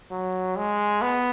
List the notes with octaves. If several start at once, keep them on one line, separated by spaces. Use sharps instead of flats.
F#3
G#3
B3